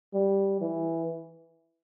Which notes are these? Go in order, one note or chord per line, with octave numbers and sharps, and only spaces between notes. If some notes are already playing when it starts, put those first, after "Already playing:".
G3
E3